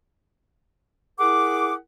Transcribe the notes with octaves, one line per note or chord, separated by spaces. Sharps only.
E4 G#4 A#4 F#5 D6